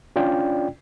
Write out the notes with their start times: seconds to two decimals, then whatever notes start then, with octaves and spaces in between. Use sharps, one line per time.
0.16 C#4 D4 F4 D5 G5